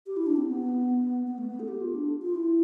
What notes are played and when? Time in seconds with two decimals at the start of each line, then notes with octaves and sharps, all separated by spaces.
0.06 G4
0.17 E4
0.26 D4
0.36 C4
0.47 B3
1.27 B3
1.38 A3
1.48 B3
1.59 A4
1.68 G4
1.81 F4
1.95 D4
2.22 F4
2.35 E4